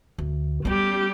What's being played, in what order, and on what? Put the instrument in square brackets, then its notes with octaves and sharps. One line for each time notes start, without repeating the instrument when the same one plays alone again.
[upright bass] D2
[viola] G3 G4 [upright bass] B3 C#4